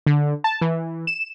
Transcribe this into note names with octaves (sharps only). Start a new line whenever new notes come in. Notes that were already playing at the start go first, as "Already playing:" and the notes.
D3
A5
E3
E7